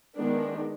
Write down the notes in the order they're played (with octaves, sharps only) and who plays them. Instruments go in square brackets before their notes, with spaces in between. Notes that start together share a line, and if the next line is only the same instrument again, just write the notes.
[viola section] D#3 G#3 B3 D4